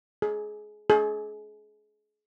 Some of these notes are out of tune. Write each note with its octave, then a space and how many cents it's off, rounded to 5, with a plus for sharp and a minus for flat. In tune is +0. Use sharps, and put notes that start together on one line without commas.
G#4 +25
G#4 +35